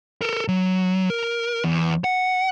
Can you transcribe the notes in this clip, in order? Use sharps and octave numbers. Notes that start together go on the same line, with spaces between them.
A4 A#4
F#3
A#4
E2
F#5